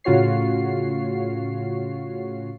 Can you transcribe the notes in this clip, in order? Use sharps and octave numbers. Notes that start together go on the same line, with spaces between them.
A2 C#3 F4 F#4 C#5 C7